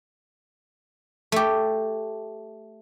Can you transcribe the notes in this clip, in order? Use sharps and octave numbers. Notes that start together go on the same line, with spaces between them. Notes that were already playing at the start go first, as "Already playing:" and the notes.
A3 G4